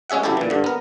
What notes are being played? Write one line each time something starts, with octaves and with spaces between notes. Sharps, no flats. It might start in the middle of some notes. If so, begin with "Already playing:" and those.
G#3 C#4 G#4 E5 F#5
C#3 F#3 E4 G4 A4
A#2 E3
G2 D3
B3 A#4